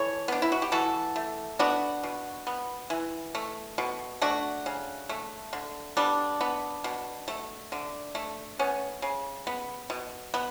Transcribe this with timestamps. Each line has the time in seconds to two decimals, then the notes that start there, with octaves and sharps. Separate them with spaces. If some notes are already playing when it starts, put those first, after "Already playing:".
Already playing: E3 A4 C#5
0.28 B3 D4
0.42 E4
0.52 F#4
0.62 G4
0.72 E3 F#4 A4
1.16 A3
1.59 B3 D4 F#4
2.04 B2
2.47 B3
2.90 E3
3.35 A3
3.78 B2
4.22 A3 D4 F#4
4.66 C#3
5.09 A3
5.53 D3
5.97 G3 B3 D4
6.41 B3
6.84 B2
7.28 A3
7.72 D3
8.15 A3
8.59 B3 C#4
9.02 C#3
9.47 B3
9.90 B2
10.34 B3